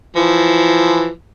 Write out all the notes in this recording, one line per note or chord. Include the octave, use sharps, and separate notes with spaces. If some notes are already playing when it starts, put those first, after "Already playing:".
E3 F3